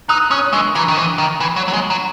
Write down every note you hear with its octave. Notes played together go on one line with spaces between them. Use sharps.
D#4 D#6 F#6
C#4 D#6 F#6
G#3 C#6 E6
E3 A#5 C#6
D#3
E3
D#3
E3
F#3
F#3
G#3
F#3